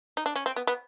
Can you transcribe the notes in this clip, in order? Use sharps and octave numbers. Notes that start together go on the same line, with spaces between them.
D#4
D4
C#4
C4
B3
B3